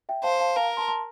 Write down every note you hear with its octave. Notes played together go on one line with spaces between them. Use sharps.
E5 G5
C5 F5 A5
F5 A5
A#4 F5 A5
A5 C6
A5 C6